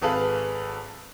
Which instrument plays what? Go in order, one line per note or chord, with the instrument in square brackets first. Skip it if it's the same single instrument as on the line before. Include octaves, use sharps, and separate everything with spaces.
[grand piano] G#1 G#4 A4 B4 F5